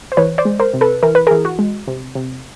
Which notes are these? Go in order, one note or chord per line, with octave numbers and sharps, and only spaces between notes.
C5
E3 B4 C#5
C5 D5
G#3
A#4 C5
C3
A4 B4
E3 A#4
B4
E3 G#4 A#4
F#4
G#3
C3
C3